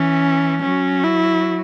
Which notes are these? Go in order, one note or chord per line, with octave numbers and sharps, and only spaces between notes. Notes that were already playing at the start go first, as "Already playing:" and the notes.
Already playing: E3 C#4
F#3 C#4
E4